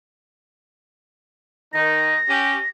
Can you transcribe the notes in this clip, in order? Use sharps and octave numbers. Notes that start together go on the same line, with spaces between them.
D#3 D#4 A#6
C#4 G4